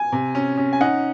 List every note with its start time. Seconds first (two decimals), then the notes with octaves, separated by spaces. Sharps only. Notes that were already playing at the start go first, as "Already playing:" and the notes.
Already playing: G#5
0.12 C3
0.35 C#4
0.58 C#4
0.73 G#5
0.81 D#4 F#5